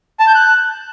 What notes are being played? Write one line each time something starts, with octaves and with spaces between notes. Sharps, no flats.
A5
G6
F#6